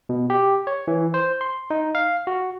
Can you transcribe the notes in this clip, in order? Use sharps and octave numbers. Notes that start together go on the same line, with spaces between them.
B2
G4
C#5
E3
C5
C6
D#4
F5
F#4